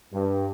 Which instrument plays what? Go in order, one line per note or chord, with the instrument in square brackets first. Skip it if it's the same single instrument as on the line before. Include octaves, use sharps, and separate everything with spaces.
[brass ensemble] G2